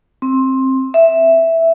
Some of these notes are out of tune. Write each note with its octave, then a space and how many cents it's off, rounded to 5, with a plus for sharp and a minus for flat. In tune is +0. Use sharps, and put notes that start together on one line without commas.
C4 +15
E5 +0